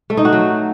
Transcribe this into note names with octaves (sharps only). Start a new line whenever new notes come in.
A3
D#4
F#4
F#3